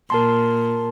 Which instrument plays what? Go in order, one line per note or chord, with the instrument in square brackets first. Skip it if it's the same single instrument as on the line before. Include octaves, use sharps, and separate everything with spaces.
[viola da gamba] A#2 [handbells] A#4 A5 C6